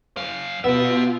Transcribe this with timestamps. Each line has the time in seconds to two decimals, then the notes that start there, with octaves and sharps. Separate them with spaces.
0.17 F#2 F5
0.64 B2 B3 F4 G4 E5